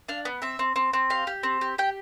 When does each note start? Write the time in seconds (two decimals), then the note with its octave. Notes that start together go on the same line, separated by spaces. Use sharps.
0.09 D4 F5
0.25 B3
0.42 C4 E5
0.59 C4
0.76 C4
0.93 C4
1.10 G4 F5
1.27 G4
1.43 C4
1.61 G4
1.78 G4 G5